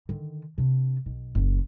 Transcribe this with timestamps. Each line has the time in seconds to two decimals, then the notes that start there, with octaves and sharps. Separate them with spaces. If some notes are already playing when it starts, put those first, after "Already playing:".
0.09 D3 D#3
0.58 C3 D4
1.06 B1
1.35 F#1 F#2